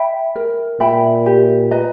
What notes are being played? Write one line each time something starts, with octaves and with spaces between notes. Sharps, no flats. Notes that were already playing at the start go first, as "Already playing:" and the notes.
Already playing: E5 G5 B5
A#4
A#2 E5 G5 B5
G4
B4 D#5 A#5